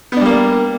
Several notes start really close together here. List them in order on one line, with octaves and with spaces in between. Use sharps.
B3 D4 G3 A#3